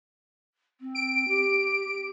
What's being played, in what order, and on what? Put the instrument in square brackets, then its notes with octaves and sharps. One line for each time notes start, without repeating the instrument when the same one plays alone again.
[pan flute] C4
[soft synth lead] D7
[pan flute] G4